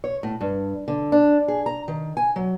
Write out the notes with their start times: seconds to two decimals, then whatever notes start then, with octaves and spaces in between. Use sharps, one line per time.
0.04 C#5
0.23 A2
0.41 G2
0.88 D3
1.12 D4
1.48 G#4
1.66 A#5
1.88 D#3
2.17 G#5
2.36 F#3